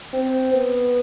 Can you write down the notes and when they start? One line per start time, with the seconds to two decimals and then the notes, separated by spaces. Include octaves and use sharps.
0.13 C4
0.54 B3